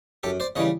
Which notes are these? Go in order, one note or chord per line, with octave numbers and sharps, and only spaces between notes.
F#2 G4 A4
C5 D5
C#3 E3 G3 C#5 D#5